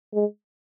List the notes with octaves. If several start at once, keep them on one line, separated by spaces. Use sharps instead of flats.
G#3